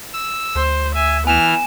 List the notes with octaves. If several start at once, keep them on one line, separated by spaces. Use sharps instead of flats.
E6
D2 C5
E5 G#5
E3 B3 G#5 F6 E7